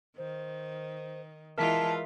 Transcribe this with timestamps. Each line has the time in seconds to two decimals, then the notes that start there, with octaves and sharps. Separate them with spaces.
0.18 D#3 C5
1.58 E3 G#3 F4 A#4 E5 A5 B6